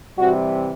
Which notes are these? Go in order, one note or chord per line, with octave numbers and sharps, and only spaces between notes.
C3 E3 G3 C4 F#4